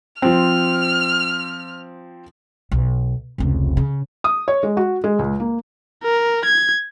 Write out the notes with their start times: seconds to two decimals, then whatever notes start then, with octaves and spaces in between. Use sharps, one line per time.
0.22 F3 C4 F6
2.71 B1
3.38 F1 C#2
3.77 C#3
4.24 D#6
4.48 C#5
4.63 G#3
4.77 F#4
5.04 G#3
5.19 C#2
5.40 A#3
6.04 A#4
6.45 G#6